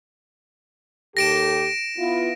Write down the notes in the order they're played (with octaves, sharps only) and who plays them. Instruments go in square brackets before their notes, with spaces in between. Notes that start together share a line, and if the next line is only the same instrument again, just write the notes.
[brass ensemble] D#2 G4 A4 [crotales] A#6 D7 E7
[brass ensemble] B3 E4 F4